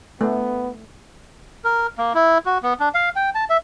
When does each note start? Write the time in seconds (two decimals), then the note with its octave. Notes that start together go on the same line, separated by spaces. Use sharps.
0.21 A3 B3
1.64 A#4
1.98 A#3
2.15 E4
2.46 F#4
2.63 B3
2.80 D4
2.94 F5
3.16 G5
3.35 A5
3.50 E5